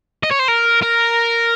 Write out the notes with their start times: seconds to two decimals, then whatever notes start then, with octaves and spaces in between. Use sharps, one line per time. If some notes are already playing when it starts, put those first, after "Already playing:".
0.23 D#5
0.31 C#5
0.39 C5
0.48 A#4
0.82 A#4